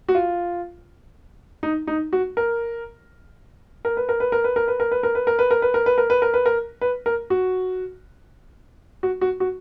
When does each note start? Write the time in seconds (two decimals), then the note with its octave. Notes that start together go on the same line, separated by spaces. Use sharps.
0.09 F#4
0.15 F4
1.63 D#4
1.87 D#4
2.13 F#4
2.37 A#4
3.85 A#4
3.97 B4
4.09 A#4
4.20 B4
4.32 A#4
4.44 B4
4.56 A#4
4.68 B4
4.80 A#4
4.92 B4
5.03 A#4
5.15 B4
5.27 A#4
5.39 B4
5.51 A#4
5.62 B4
5.74 A#4
5.86 B4
5.98 A#4
6.10 B4
6.22 A#4
6.34 B4
6.46 A#4
6.81 B4
7.06 A#4
7.30 F#4
9.03 F#4
9.21 F#4
9.40 F#4